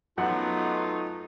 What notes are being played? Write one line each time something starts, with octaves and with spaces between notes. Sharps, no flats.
F#2 F#3 A3 B3 D#4 F4 F#5